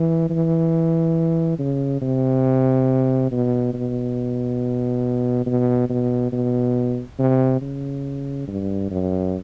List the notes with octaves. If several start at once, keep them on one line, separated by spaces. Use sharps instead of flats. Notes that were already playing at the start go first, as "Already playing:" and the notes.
Already playing: E3
E3
C#3
C3
B2
B2
B2
B2
B2
C3
C#3
G2
F#2